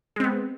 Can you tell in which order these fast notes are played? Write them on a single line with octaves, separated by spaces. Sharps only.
G#3 C4 B3